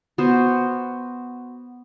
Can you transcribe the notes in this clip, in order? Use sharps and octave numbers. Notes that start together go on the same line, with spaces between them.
B3 F#4 C5